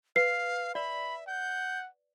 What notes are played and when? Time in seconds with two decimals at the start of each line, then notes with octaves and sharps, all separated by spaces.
0.16 B4 F5 C7
0.75 D5 E5 B5
1.27 F#5 G6